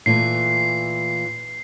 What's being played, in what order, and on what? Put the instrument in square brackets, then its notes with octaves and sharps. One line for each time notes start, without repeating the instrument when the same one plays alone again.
[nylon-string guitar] A#2 E3 A3 [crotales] C7